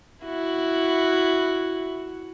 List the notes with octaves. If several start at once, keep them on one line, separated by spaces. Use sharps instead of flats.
E4 F#4